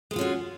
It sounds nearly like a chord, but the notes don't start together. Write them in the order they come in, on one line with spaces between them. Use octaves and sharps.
G#3 B3 F4 C#4 F#4